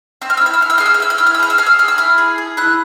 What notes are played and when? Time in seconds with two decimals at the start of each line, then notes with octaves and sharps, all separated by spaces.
0.22 C4 E6
0.30 F6
0.37 E6
0.41 E4 F6
0.54 E6
0.61 E4 F6
0.70 E6
0.78 G#4 F6
0.86 E6
0.94 F6
1.00 E4 E6
1.10 F6
1.18 E4 E6
1.27 F6
1.35 E6
1.39 G#4 F6
1.50 E6
1.58 G#4 F6
1.66 E6
1.79 G#4 F6
1.88 E6
1.98 E4 F6
2.18 G#4
2.38 G#4
2.57 E4 F#6